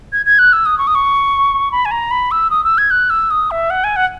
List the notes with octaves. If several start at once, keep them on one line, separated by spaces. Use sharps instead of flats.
G#6
G#6
F#6
E6
D#6
C#6
D#6
C#6
B5
G#5
A#5
B5
E6
D#6
E6
G#6
F#6
E6
D#6
E5
F#5
G#5
F#5